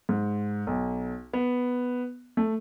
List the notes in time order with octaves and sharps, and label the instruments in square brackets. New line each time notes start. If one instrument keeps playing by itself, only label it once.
[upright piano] G#2
B1
B3
A3